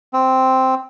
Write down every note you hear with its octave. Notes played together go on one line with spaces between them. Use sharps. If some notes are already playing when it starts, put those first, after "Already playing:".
C4